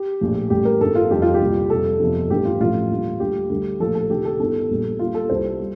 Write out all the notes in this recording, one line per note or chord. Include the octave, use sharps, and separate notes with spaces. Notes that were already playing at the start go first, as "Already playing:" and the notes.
Already playing: G4
A#1 A2 F3
A1 A2 G3 G4
A#4
G1 G2 D#3 A4
F4
F1 F2 D#3 G3 G4
F4
G4
C2 A#2 G3
F2 C3 G3 A4
G1 F2 C3 F3
A1 G2 D#3 G4
F4
A1 A2 F3 F4
D#2 D3 G3
D2 D3 G3 G4
D2 D3 G3
A#1 A2 F3 A4
A4
D2 C3 D#3 G4
A4
G1 G2 D#3 A4
A#1 A#2 G3
D#2 D3 G3 F4
A4
C2 C3 G3 C5
G3